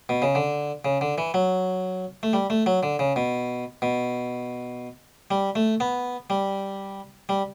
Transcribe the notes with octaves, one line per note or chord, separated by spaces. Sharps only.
B2
C#3
D3
C#3
D3
E3
F#3
A3
G3
A3
F#3
D3
C#3
B2
B2
G3
A3
B3
G3
G3